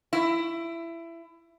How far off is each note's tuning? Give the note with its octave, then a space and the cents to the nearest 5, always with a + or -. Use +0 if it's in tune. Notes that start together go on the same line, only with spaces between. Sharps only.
E4 +20